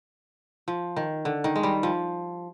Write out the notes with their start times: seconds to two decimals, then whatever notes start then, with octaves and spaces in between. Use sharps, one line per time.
0.68 F3
0.96 D#3
1.25 D3
1.44 D#3
1.56 G#3
1.63 G3
1.83 F3